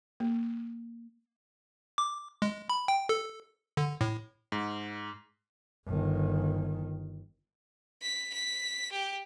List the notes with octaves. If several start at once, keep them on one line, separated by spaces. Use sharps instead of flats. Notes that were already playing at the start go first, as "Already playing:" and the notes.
A#3
D6
G#3
B5
G5
A4
D3
A2
G#2
G1 D#3
B6
B6
G4